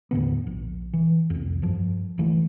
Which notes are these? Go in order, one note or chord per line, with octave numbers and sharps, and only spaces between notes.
D#2 A2 D3 B3
A#1
E3
C2 F2
G2 F3
D1 E3 A3